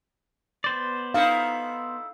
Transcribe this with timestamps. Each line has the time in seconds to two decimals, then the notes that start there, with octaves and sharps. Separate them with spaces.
0.64 B3 C5 D5
1.14 D#4 E4 A4 F5